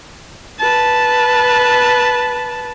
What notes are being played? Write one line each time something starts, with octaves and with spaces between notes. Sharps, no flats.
B4 A5